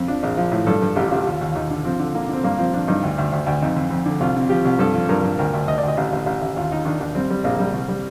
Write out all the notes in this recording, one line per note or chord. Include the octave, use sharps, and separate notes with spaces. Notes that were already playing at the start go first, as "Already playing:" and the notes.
Already playing: F2
F3 D4
A#1
F3
A2
G2 A4
G2
A1 G4
F4
A1 G4
D#2 F4
D#2
F4
D#2 D#4
D3
F3 C4
D3
D3 A#3
D3 C4
G2 A#3
F3 C4
F3 D4
G2 D#4
D2
D2
D2
D2
F2 D#4
F2
F2
D3
C2 F4
C3
F3 G4
C2
G2 A4
F3
G2 A#4
G2
D2 A#4
D2
D2 D#5
D2 D5
D#5
A1
A1
A1
A1
D#2 F4
D#2 D#4
D#3 D4
D#2 D4
G3 C4
G3
A#1 A#3
G3
C2
G3